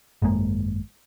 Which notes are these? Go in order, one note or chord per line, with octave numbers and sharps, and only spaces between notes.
G#1 F#2 G#3 A#3